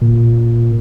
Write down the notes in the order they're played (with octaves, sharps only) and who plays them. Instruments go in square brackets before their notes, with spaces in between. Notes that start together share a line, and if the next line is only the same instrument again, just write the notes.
[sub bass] A#2